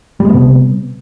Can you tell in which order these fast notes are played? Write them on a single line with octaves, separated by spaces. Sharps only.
G3 G#3 B3 C3